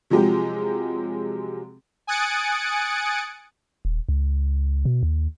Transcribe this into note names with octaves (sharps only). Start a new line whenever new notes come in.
C3 F3 F#3 G#3 G4
G#5 D#6 F#6 A6 C#7 D7
D#1
C#2
B2
D#2